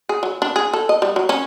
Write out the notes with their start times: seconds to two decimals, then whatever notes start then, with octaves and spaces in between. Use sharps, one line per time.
0.09 G#4
0.23 F#3
0.42 D4
0.56 G#4
0.73 A4
0.89 D#5
1.02 G3
1.16 F#3
1.29 C#4